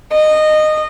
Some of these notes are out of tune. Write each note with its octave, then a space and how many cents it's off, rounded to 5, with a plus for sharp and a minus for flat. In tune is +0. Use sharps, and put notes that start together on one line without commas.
D#5 -15